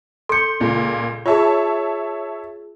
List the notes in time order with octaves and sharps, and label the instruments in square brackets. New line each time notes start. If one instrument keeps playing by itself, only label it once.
[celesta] A4 C#7 [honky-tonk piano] C6 G6
[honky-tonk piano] C#2 A#2
[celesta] F4 G#4 [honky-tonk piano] C#5 E5 A5